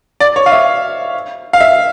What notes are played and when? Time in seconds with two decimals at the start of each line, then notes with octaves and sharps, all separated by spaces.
0.20 D5
0.36 C#5
0.46 F5
0.52 E5
1.53 F5
1.61 E5